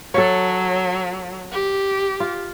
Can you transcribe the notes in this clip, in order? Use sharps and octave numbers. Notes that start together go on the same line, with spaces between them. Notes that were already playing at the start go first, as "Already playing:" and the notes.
F#3 A4 C#5
G4
F4